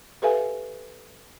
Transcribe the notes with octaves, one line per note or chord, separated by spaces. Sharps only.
G4 A4 B4 E5 F5 G#5